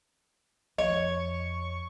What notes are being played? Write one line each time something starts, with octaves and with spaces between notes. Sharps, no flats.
F2 C#5 D#5 C#6